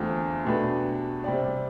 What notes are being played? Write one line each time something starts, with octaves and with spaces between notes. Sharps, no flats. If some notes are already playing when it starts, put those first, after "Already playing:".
Already playing: E2 D3 A3 C4 F4
B2 A3 D4 G4 B4
C3 G3 C4 G4 D5